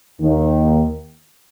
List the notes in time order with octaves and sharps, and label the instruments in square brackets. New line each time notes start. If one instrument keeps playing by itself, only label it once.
[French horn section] D#2 D#3